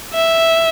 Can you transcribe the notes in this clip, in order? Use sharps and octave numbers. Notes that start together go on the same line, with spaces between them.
E5